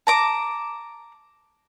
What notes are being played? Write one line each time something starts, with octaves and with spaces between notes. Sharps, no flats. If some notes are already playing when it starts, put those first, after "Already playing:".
A5 A#5 D6